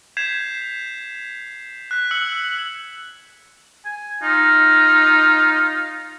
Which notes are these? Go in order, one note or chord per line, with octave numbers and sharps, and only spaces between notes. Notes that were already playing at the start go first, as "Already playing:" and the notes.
G6 G#6 B6 C7 E7 F7
F#6 B6
E6 C#7 F#7
G#5
D#4 F4